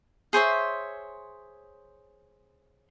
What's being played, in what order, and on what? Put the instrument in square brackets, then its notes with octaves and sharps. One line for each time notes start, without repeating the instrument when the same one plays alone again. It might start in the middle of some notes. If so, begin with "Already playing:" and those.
[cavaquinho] G#4 C5 C#5 E5